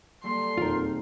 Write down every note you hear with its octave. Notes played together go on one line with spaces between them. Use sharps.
G3 A#3 A4 C6
E1 F2 D#3 D#4 F4 A#4